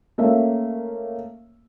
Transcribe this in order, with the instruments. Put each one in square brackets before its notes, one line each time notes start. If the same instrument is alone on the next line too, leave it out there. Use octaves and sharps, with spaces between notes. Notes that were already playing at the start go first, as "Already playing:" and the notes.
[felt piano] A3 A#3 C#4 E5 F5